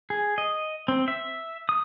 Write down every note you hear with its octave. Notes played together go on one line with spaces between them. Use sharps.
G#4
D#5
C4
E5
D#6